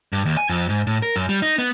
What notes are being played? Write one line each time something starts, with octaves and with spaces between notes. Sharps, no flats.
G2
D#2
G#5
F2
G#2
A2
A#4
F#2
G3
D#4
B3